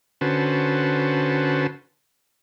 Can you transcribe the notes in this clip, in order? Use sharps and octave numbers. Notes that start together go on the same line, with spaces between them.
D3 C#4 F#4 B4 C5 A5